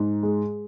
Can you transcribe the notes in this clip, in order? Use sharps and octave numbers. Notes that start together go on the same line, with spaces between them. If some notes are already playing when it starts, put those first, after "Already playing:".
Already playing: G#2
G#3